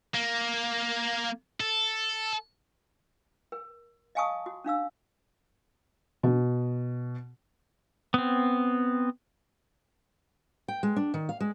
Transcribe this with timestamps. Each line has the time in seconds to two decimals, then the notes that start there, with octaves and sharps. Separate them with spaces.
0.14 A#3
1.60 A4
3.52 A#4
4.15 D#5 F5 G#5 A5 C#6 D#6
4.46 F#4
4.64 C#4 D4 F5 E6
6.23 B2
8.14 B3 C4
10.68 G5
10.83 G#3
10.96 D4
11.14 D#3
11.29 F5
11.40 G#3